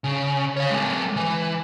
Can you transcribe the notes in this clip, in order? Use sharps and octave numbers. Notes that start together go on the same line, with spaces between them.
C#3
C#5 F5
G#3 A#3
E3